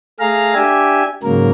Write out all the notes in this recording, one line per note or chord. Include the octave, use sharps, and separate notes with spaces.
A3 G#4 F5 A#5
D4 G4 E5 G#5
G#2 C#3 F#3 A#3 A#4